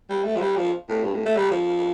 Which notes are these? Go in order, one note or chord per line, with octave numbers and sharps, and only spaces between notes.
G3
A3
F3
G3
F3
A2
G2
A2
A3
G3
F3